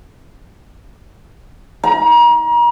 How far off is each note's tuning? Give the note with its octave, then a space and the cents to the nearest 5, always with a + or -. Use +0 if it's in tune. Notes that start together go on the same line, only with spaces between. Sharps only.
A#5 +35